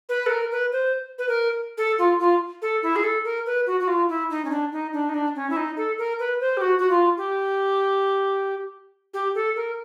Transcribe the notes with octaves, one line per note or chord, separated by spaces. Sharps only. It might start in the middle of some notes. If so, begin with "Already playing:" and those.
B4
A4
A#4
B4
C5
B4
A#4
A4
F4
F4
A4
E4
G#4
A4
A#4
B4
F#4
F#4
F4
E4
D#4
C#4
D4
D#4
D4
D#4
D4
C#4
E4
D#4
A4
A#4
B4
C5
G4
F#4
F#4
F4
G4
G4
A4
A#4